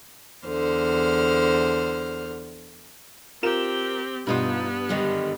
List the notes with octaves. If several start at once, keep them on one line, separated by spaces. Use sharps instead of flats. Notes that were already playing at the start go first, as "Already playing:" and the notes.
E2 D3 C5 F6
C4 F4 G4 A#4 E7
G2 B2 B3 D#4 F4
F#2 D3 D#3 G3 G4 D#5